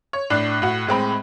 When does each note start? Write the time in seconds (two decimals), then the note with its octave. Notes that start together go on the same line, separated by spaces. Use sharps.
0.13 C#5
0.30 A2 D4 F#6 C7
0.62 A2 F#4
0.87 A2 G#3 C4 B5